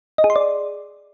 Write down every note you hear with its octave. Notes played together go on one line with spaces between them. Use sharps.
D#5
G#4
C6
D5